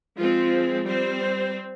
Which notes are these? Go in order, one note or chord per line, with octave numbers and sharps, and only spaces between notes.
F3 G#3 C4 F4
G3 C4 C5